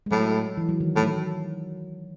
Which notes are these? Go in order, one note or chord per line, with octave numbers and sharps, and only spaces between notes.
G#3
A2 F#3
E3
F#3
D#3
A2
F#3